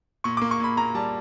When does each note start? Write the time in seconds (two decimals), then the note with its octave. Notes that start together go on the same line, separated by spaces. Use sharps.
0.24 A#2 C#6
0.37 D6
0.42 A#3
0.51 C#6
0.60 A#2 B5
0.77 A#2 A#5
0.95 G3 A5